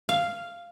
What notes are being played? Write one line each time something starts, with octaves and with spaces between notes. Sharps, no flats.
F5